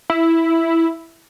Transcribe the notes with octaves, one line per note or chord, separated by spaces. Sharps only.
E4